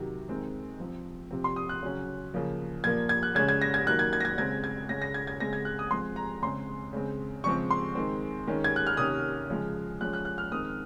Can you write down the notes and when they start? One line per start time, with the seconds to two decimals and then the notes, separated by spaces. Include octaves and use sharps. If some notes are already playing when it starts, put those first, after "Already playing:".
Already playing: C3 D#3 F#3
0.29 D#3 G#3 C4
0.80 F3 C4
1.31 C3 F3 C4
1.44 C6
1.56 D#6
1.69 F#6
1.82 C#3 F#3 C#4
2.34 C#3 F3 A#3
2.84 A#2 G#6
2.87 F3 A#3
3.09 G#6
3.23 F#6
3.35 C#3 G#3 C#4 G#6
3.49 G#6
3.62 A#6
3.74 G#6
3.87 D#3 F#3 A#3 F#6
3.99 G#6
4.13 G#6
4.20 A#6
4.25 G#6
4.38 C#3 G#3 C4 G#6
4.64 G#6
4.89 C#3 G#3 C#4 A#6
5.02 A#6
5.14 G#6
5.27 G#6
5.40 C#3 G#3 C4 A#6
5.53 G#6
5.65 F#6
5.79 D#6
5.91 F3 G#3 C4 C6
6.16 A#5
6.42 C#3 G#3 C4 C6
6.93 C#3 G#3 C4
7.44 C#3 F3 G#3 C4 C#6
7.71 C6
7.95 D#3 G#3 C4
8.47 D#3 G#3 C#4
8.64 G#6
8.76 F#6
8.87 F6
8.97 C3 D#3 A#3 C#4 D#6
9.49 C#3 F3 G#3
10.01 F3 G#3 C#4 F#6
10.13 F#6
10.25 F#6
10.38 F6
10.52 D#3 G#3 C4 D#6